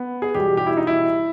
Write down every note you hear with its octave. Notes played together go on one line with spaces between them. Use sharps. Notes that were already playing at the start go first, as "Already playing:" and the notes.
Already playing: B3
G#4
E2 B2 G3 G4
G4
E4
D#4
E4